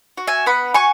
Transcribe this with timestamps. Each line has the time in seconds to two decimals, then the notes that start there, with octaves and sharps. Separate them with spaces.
0.18 F#4
0.27 E5 G#5
0.46 B3 F#5 B5
0.74 F#4 G#5 C#6